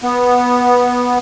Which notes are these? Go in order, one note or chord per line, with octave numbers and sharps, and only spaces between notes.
B3